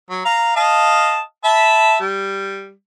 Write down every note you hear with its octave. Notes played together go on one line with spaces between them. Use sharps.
F#3
F5 A#5
D#5 F5 A5
E5 A5 B5
G3